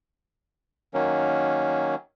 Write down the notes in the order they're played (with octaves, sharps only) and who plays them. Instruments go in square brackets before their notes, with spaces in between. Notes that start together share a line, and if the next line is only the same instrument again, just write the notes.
[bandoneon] D#3 F#3 A#3 C#4